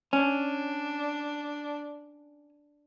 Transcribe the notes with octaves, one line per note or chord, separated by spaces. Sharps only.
C#4 D4